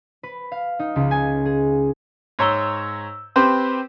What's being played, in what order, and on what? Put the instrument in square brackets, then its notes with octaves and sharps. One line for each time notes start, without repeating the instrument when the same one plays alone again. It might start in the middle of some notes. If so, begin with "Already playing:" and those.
[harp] B4
F5
D#4
C#2
G#5
G#4
[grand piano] G#2 C#5 A#5 E6 G7
C4 G4 B4 C5